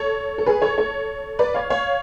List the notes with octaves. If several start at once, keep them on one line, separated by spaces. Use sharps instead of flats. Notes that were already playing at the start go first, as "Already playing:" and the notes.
Already playing: A4 C#5
A4
G#4 B4
A4 C#5
A4 C#5
B4 D5
C#5 F5
C#5 F5